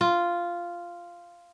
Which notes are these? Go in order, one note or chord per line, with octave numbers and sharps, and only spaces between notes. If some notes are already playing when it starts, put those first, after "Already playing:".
F4